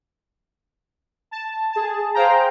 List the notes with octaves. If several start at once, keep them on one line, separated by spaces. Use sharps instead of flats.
A5
G#4 A5
G#4 C5 F5 G5 A#5